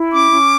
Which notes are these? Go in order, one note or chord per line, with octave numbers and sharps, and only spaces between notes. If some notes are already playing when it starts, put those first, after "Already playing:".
Already playing: E4
C#4 D6
C#4